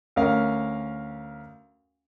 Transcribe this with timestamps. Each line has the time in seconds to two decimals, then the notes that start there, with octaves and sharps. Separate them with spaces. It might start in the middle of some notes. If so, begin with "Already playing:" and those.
0.16 D2 C#4 A#4 F5